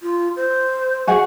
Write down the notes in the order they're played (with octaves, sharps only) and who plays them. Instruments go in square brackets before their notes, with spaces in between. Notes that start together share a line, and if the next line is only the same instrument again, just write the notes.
[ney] F4
C5
[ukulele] F#4 G#4 F#5